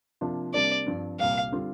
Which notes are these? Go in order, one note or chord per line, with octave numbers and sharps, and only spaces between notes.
C3 F3 A#3 D4 F4
C3 G3 A#3 D4 D5
G2 F3 C4
C2 A#2 G3 F5
D3 G3 C4 F4